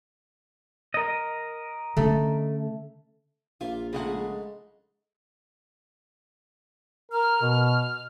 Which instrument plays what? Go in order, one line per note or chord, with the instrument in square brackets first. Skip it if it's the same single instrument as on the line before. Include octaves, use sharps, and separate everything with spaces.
[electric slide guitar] A#4 D#5
[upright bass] D3 C#4 [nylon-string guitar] A3
[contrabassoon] A#1 [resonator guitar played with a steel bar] F4 [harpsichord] E5 F5
[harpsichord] G#2 A3 D#4 [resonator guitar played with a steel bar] C#3 G#3 F#5
[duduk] A#4 [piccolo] F6
[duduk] B2